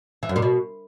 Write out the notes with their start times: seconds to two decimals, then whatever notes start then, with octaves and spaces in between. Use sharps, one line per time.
0.23 E3
0.29 F#2
0.36 A#2
0.42 B2